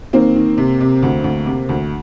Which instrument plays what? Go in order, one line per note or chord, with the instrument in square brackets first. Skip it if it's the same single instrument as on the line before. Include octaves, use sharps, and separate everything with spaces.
[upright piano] D#3 A#3 C4
D#3
C3
C3
D2
D2
C3
D2